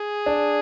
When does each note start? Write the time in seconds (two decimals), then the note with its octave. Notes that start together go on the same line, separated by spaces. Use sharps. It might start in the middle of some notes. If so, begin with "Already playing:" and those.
Already playing: G#4
0.26 D4